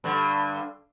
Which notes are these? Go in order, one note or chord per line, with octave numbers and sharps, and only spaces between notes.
G2 D3